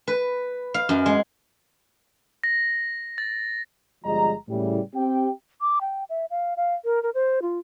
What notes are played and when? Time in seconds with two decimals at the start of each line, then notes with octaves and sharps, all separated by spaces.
0.07 B4
0.74 F5
0.89 F#2
1.06 G#3
2.44 A#6
3.18 A6
4.05 G1 F3 G3 G#3 D#5 A#5
4.49 A2 C#3 E3 G3
4.95 C4 G4 G5
5.61 D6
5.81 G5
6.10 E5
6.30 F5
6.57 F5
6.85 A#4
7.03 A#4
7.14 C5
7.42 F4